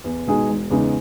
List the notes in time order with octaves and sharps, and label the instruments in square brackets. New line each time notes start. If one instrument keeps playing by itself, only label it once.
[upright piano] E2
B2 G#3 D#4 G#4
E1
E2 C#3 G#3 D#4